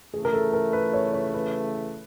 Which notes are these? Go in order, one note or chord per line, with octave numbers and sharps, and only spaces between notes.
C#3 E3 A3 G#4
A#4
A4
A#4
B4
C#5
C#5
B4